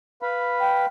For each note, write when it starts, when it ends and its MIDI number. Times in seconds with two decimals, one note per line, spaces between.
0.22 0.86 71
0.22 0.86 77
0.22 0.86 83
0.60 0.86 79